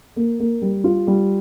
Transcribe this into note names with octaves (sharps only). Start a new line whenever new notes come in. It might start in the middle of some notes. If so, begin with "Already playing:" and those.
A#3
A#3
G3
F4
G3